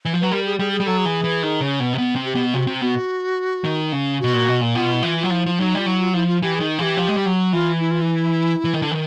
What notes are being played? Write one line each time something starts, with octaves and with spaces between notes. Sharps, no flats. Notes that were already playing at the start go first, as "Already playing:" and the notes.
E3
F3
F#3 B4
G3 A#4
G#4
G3 G#4
G#4
G3
F#3 A4
G#4
E3
E3
D#3
C#3
B2
C3
B2
C3
G4
B2
C3 F#4
C3
B2 F#4
D#3
C#3
B2 F#4
A#2
B2
A#2
B2 F4
E4
E3 F4
F#3 F4
F3 E4
F3
F#3 D#4
G3 F4
F#3 E4
F4
F3 E4
F4
E3 G4
G#4
D#3
E3 G4 G#4
F3
G#3
G3
F#3
E3 F4
E4
F4
E4
E3
D#3
D3
D#3